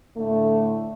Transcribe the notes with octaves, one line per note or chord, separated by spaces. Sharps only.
A2 D3 A3